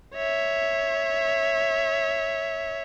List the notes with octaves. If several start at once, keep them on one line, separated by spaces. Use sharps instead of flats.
C#5 E5